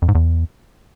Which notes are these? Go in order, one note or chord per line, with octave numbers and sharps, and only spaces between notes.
F2
G#2
E2